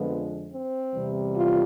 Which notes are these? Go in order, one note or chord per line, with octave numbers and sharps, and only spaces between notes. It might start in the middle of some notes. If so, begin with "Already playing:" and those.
Already playing: F2 D3 F3 G#3 B3
C4
E2 C3 E3 G3
F4